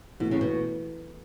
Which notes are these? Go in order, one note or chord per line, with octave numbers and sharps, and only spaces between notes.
B2 E3 A3 E4
C#3
B2